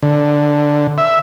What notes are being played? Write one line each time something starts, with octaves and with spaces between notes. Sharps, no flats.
D3
E5